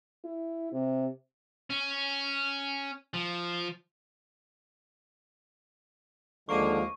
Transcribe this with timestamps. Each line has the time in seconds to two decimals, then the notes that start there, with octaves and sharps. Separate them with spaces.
0.24 E4
0.72 C3
1.70 C#4
3.14 F3
6.49 D#2 D3 F3 G#3 A#3 C#6 D#7